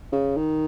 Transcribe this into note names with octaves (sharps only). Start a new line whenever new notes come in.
C#3
D#3